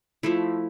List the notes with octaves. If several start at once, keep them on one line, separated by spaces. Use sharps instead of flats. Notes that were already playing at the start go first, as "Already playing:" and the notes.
F3 A3 E4